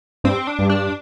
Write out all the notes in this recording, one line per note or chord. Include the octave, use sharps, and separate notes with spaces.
G2 C4
D4
G2
D4